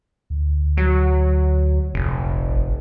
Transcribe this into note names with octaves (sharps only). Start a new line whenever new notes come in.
D2
F#3
F1 A#1
G#1